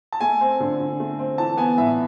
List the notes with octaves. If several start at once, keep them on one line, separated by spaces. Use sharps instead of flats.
A5
A3 G#5
C4
D3
D3
A3
C4
E3 A5
B3 G#5
A2 E5